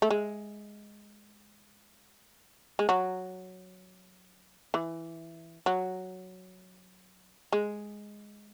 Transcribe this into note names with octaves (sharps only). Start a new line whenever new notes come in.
A3
G#3
G#3
F#3
E3
F#3
G#3